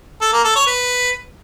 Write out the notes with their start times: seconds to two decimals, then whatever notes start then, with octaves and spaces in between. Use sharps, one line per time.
0.21 A4
0.33 A#3
0.44 A4
0.56 C#5
0.67 B4